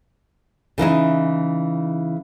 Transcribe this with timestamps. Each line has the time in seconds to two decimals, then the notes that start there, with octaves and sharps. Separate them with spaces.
0.78 C#3 E3 D#4 E4